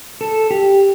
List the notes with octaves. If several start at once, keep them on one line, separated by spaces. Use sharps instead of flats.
A4
G4